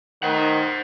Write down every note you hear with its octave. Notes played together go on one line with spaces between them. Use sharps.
D#3 C5 F#5